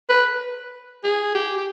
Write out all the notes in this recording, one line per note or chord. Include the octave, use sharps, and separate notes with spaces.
B4
G#4
G4
G4